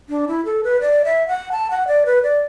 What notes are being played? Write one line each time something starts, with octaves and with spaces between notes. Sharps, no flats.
D4
E4
A4
B4
D5
E5
F#5
A5
F#5
D5
B4
D5